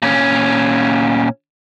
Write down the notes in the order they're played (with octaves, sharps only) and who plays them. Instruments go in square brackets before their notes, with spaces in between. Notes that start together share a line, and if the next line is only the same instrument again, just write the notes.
[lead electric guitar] A#2 C#4